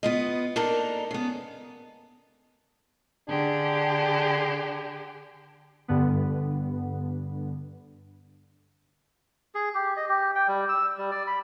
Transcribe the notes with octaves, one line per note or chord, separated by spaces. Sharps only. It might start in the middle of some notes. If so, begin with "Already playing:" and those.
B3 F4 D#5
A#3 D4 D#4 A4 A#4
C#3 B3
D3 D4 G4 G#4
G2 D3 B3
G#4
G4
D#5
G4
G5
G3
E6
G3
D5
B5